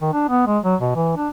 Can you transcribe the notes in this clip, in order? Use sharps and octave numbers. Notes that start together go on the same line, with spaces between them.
D#3
D4
B3
G#3
F#3
B2
E3
D4